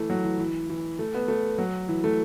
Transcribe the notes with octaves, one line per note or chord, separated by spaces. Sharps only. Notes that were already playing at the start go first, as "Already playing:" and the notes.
Already playing: E3 A3
F#3
E3
E3
E3
A3
B3
A3
F#3
E3
A3